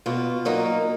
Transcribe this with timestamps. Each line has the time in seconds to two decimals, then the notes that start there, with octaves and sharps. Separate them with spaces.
0.06 B2 F4
0.45 F#3 A#3 D#4